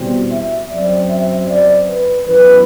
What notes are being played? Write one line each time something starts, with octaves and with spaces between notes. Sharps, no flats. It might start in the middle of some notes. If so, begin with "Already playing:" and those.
Already playing: E2 B2 G3 C4
E5
F#2 F#3 C4 D5
E5
D5
B4
F#2 E3 B3 B4